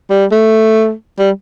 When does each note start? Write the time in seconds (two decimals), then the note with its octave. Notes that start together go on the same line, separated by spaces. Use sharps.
0.10 G3
0.32 A3
1.19 G3